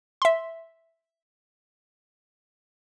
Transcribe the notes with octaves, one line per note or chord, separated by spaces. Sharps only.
E5 C6